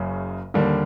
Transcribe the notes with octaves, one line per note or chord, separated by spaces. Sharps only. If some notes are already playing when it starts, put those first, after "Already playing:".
Already playing: F#1 F#2 C#3
D#2 D3 G3 A#3